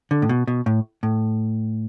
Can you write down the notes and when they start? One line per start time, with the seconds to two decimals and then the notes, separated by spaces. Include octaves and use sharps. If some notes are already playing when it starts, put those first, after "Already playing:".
0.11 D3
0.22 A2
0.29 B2
0.47 B2
0.66 A2
1.03 A2